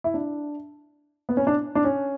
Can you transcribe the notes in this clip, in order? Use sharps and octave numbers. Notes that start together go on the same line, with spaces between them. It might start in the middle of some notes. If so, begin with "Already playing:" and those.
E4
D4
B3
C#4
D4
D4
C#4